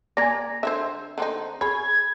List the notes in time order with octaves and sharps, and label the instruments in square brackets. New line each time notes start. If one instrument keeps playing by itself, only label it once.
[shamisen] A#3 A#5 [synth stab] D5 [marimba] G#5 G#6 A#6
[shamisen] D3 F#4 C5 [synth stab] E5
[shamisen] D3 C4 D#4
[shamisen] G#4 C#5 [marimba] B5 [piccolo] G#6